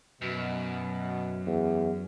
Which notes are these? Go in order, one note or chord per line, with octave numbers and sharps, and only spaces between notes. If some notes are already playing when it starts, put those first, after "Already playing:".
F#2 B2
E2